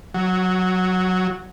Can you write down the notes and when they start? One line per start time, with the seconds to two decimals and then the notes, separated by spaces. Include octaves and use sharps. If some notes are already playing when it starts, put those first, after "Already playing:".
0.14 F#3